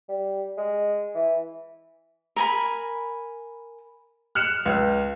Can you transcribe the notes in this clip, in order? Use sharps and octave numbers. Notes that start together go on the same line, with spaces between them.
G3
G#3
E3
A#4 G#5 B5
F6 F#6 C#7 E7
C#2